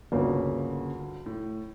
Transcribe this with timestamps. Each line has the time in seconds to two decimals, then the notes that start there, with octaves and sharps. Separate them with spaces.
0.12 G1 D2 C#3 A#3 C#5
1.26 A2